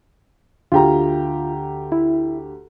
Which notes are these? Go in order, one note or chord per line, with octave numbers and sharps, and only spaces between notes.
D2 F4 G4 A#5
E4